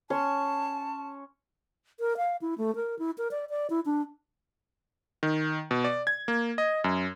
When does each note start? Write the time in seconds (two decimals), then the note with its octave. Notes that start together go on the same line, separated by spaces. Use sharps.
0.10 C#4 C#5 A5 C6
2.00 A#4
2.17 F5
2.41 E4
2.58 A3
2.76 A#4
2.99 E4
3.18 A#4
3.31 D5
3.50 D5
3.70 E4
3.86 D4
5.23 D#3
5.71 B2
5.84 D5
6.07 G#6
6.28 A#3
6.58 D#5
6.84 F#2